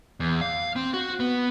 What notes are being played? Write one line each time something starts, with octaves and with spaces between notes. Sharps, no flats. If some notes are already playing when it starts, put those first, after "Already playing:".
E2
F5
C4
F#4
B3